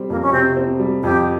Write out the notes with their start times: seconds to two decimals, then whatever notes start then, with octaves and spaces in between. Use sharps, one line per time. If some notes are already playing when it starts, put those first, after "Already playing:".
Already playing: G3 C4
0.10 F2 A#3
0.23 C#4
0.32 C3 C4
0.57 C4
0.79 G3
1.03 F2 G4